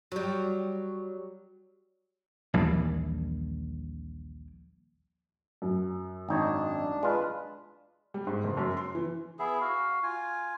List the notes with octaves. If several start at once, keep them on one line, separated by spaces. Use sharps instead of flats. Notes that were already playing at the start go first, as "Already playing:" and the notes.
F#3 G3
A#1 D#2 E3 G3
F#2
G#1 D4 D#4 C#5
G#3 D4 F4 B4
G3
G#2
F#1
F#2
C6
E3
B3 E4 G#4 E5
F#4 F5
F4 G#5